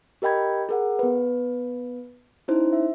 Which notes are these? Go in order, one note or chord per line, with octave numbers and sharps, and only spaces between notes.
G4 A#4 D#5 G5 B5 G#6
G#4 A#4 F#5
B3 B4
C#4 D#4 E4 C5
E5